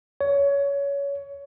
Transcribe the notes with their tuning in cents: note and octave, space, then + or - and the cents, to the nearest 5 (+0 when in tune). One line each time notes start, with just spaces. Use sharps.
C#5 +20